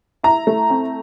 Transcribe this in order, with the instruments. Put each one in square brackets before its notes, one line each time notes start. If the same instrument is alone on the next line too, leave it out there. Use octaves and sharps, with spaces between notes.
[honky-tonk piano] E4 [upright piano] A#5
[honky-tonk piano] A3
C4